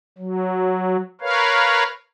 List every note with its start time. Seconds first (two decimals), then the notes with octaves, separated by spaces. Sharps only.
0.18 F#3
1.21 A#4 B4 C#5 F5